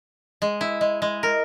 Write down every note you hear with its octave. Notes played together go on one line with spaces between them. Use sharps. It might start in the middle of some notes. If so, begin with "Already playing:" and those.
G#3
E4
G#3
G#3
A#4